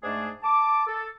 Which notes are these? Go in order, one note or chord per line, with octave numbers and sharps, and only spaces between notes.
G#2 A3 D4 G#4
A5 D6
A4